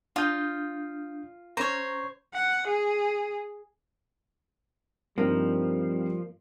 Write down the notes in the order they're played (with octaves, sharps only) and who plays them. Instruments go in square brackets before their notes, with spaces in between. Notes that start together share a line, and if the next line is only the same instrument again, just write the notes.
[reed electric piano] D4 D#6 G6 [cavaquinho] F4
[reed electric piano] C#4 A#5 [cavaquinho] C5 C#5
[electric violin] F#5
G#4
[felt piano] G2 C4 D#4 [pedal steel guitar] F3 [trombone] G3 [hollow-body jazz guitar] A#3